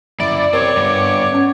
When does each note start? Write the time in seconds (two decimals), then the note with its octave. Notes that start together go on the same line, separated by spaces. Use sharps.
0.20 F#2 E4 D5
0.53 C4 G4 A#4 C#5
0.77 G2 B3
1.32 C#4 F#5